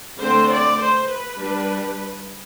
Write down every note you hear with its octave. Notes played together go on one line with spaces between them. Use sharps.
D3 A3 C4 C5
D5
C5
B4
G3 D4